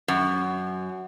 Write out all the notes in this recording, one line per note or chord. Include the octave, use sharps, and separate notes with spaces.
F#2